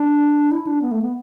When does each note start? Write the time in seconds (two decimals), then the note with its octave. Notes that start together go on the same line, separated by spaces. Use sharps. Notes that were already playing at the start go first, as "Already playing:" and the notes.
Already playing: D4
0.51 E4
0.67 D4
0.82 B3
0.91 A3
1.02 B3